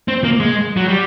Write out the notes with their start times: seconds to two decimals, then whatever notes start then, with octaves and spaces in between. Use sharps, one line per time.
0.08 C4
0.24 A#3
0.40 G#3
0.77 F#3
0.88 G3